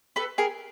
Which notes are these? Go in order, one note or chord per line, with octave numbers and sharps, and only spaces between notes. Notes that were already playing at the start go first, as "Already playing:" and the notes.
A4 B4
G#4 A#4